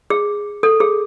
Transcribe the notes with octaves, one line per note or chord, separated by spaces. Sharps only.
G#4
A4
G#4